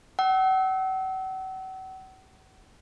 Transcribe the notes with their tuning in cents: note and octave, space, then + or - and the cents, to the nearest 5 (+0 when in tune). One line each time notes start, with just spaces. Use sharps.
F#5 +40 E6 -25